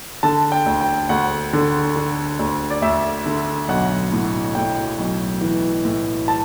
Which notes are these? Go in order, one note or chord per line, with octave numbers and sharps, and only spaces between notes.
D3 A5
G5
D2
G5
D2 F#5
D3
D3
D2
D5
D2 E5
D3
B1 F#5
A2
A2 G5
B1
E3
A2
A5